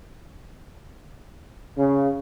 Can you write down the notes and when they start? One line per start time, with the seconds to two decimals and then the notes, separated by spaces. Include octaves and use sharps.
1.77 C#3